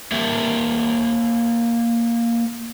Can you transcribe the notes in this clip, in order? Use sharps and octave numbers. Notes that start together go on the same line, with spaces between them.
A#3 G4 A#4 E5